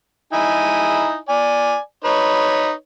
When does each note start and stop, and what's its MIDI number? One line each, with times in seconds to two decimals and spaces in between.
0.33 1.18 63
0.33 1.18 64
0.33 1.18 80
1.29 1.78 74
1.29 1.78 80
2.04 2.72 63
2.04 2.72 71
2.04 2.72 73